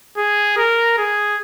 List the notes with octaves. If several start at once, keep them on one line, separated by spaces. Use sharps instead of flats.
G#4
A#4
G#4